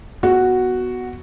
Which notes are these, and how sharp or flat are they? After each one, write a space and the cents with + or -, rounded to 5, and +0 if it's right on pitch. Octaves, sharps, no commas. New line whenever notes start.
B3 +0 F#4 +0